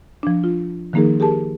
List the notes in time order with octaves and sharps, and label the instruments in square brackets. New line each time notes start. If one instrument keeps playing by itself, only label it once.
[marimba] F3 D4
F4
D#3 F3 A#3 D#4 G#4 A#4
G4 G#4 A#4 A5